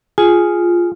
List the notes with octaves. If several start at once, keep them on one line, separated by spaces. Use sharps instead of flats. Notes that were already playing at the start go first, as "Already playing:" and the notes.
F4 G#4